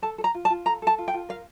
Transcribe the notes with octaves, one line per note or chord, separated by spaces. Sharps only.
A4 A5
A4
A#5
F4
A5
F4
A4 A#5
A4 A5
F4
G5
F4
A#4 F5